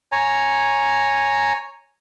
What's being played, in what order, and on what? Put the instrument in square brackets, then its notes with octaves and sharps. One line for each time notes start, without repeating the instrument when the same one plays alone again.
[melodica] C#5 G#5 A#5